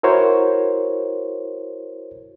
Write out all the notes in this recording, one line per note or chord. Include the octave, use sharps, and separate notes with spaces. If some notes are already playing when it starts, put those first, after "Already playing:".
E4 F#4 A#4 C5 C#5